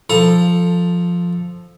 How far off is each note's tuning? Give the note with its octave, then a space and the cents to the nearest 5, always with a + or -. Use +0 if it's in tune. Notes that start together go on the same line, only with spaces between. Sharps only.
F3 +0 A4 +0 A#5 +15